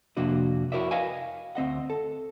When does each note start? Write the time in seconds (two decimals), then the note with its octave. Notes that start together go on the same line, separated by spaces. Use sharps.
0.17 F2 C3 A#3 D4 F#4 D#5
0.72 E4 F#4 A#4 C#5 D5 E5
0.91 B4 D#5 F5 G5 G#5
1.55 D2 C4 D#5 F#5
1.90 A4